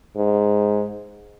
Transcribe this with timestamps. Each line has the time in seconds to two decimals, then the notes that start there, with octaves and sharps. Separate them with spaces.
0.17 G#2